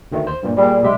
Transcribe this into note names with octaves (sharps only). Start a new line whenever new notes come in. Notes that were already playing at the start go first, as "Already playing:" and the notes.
D2 D#3 A3
C5
G2 A#2
A#2 G3 G#4
B1 G3 G#3 G4 E5